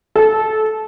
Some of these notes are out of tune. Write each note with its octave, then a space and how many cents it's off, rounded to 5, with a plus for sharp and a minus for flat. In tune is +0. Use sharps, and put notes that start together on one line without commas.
A4 -20